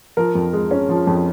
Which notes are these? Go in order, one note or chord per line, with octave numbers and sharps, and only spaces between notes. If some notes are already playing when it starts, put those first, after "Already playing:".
F3 A#4
F2
G#3
C#4
F3
F2